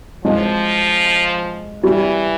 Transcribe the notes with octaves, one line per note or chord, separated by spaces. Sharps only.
F3 G#3
E3 G3